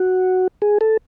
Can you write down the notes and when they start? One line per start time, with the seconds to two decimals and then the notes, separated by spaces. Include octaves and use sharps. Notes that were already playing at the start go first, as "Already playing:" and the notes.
Already playing: F#4
0.62 G#4
0.81 A4